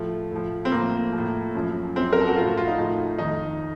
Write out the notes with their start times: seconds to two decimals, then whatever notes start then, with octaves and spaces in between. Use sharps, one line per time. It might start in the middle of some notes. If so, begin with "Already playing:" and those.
Already playing: A2 F3 A3
0.31 A2 F3
0.65 C4
0.72 A2 A#3
0.78 F3
1.13 A2 F3
1.55 F#2 F3
1.95 F#2 F3 C4
2.13 A#4
2.20 A4
2.28 F#4
2.36 F3 F4
2.41 A2
2.47 F#4
2.57 F4
2.68 D#4
2.78 A2 F3
3.18 F2 D#3 D#4